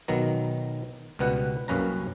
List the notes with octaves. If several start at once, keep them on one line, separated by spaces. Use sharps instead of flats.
B1 D#3 F#3 B3 A#5
C#2 B2 G3 B3 F#5
C2 F#2 A#3 C#4 B4 A#5